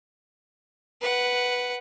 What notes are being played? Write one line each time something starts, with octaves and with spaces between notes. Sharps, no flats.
B4 F#5